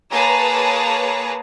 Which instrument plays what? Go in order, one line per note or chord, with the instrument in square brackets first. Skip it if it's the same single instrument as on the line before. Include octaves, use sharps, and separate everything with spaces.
[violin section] A#3 G#4 B4 C#5 A5 A#5